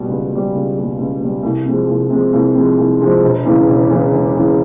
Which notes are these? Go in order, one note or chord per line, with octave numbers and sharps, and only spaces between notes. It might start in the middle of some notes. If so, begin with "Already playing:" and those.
Already playing: B2 G3
C#2
B2 G3
C#2
B2 G3
C#2
B2 G3
C2
C3 F3 G#3
C2
C3 F3 G#3
C2
C3 F3 G#3
C2
C3 F3 G#3
E1
E2 C#3 E3
E1
E2 C#3 E3
E1
E2 C#3 E3